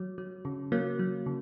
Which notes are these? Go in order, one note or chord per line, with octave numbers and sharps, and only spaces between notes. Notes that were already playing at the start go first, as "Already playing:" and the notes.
Already playing: F#3
F#3
C#3
F#3 A#3
F#3
C#3